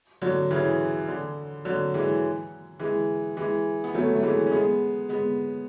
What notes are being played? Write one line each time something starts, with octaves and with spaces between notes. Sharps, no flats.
D3 F#3
C#3 E3
D3
D3 F#3
E3 G#3
E3 G#3
E3 G#3
B3
F#3 A3
A3
E3 G#3
C#4
G#3 B3
G#3 B3